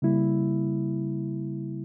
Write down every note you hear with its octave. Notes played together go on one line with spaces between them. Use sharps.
C#3 G3 A#3 E4